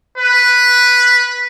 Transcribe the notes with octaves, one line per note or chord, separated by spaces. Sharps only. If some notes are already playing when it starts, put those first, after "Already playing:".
B4